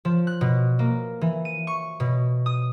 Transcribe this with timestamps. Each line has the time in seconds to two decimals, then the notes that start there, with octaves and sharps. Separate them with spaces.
0.05 F3
0.27 F#6
0.41 B2
0.79 A#3
1.21 E3
1.45 D#7
1.67 C#6
2.00 B2
2.46 D#6